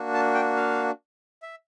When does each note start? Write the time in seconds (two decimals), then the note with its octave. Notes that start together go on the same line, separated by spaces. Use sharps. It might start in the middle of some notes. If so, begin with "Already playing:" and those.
Already playing: A#3 D4 F#4
0.14 A5
0.34 G5
0.57 F5
1.42 E5